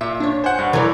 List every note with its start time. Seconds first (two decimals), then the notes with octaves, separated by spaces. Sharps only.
0.01 A#2 E5
0.20 D4 C#5
0.44 C5 F#5 G#5
0.59 G2
0.73 E3 A#4 C#5 D5